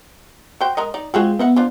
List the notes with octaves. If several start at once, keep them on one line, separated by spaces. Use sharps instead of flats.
F#4 C5 G5
G#3 A#4 D#5
D#4 D5
G#3 C4 F4 F#4 G#4
B3 D#5 E5 F#5
D4 F4 C5